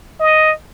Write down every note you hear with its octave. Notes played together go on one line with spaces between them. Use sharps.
D#5